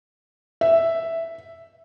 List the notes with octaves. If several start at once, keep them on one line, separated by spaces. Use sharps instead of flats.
E5